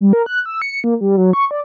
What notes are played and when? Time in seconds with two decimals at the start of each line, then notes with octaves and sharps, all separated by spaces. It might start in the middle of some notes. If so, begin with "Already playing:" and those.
0.01 G3
0.13 A#4
0.26 F#6
0.46 E6
0.62 C#7
0.84 A#3
1.01 G3
1.17 F#3
1.33 C#6
1.51 D5